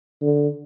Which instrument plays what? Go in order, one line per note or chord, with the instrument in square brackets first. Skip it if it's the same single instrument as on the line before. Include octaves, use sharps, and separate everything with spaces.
[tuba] D3